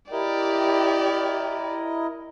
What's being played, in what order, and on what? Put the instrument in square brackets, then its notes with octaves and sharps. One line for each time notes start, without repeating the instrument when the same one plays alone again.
[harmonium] E4 A#4 D#5 [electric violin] G4 D5